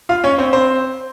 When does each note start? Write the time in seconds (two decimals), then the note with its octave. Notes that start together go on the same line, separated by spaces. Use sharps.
0.09 F4 F5
0.24 C#4 C#5
0.38 C4 C5
0.53 C4 C5